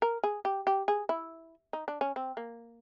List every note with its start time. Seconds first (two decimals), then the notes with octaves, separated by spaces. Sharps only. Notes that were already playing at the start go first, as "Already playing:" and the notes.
0.02 A#4
0.24 G#4
0.45 G4
0.67 G4
0.88 G#4
1.09 E4
1.73 D#4
1.88 D4
2.01 C#4
2.16 C4
2.37 A#3